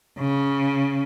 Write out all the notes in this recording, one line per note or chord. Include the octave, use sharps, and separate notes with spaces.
C#3